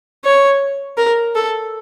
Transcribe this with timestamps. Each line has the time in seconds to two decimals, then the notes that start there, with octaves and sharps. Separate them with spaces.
0.24 C#5
0.97 A#4
1.35 A4